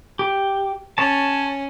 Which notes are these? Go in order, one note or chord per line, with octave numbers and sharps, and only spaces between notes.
G4
C#4 C#5 A5